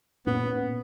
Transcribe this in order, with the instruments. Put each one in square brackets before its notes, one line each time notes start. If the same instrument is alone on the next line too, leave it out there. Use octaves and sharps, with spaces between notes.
[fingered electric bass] A#2 A#3 C#4 [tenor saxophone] B3